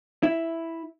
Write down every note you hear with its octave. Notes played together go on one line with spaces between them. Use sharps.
E4